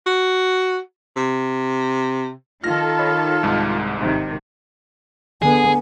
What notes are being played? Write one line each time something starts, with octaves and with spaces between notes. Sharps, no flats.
F#4
C3
D#3 F4 A4 F6 A#6
C#5 D#5 B5
C2 G#2 G#3
G#1 C3 D#3
D3 B3 G#4 G#5